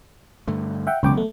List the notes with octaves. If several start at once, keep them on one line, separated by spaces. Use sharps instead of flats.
G2 D3 A3
E5 F#5 G5
E1 C#2 F#3 B3 G5 D6
A3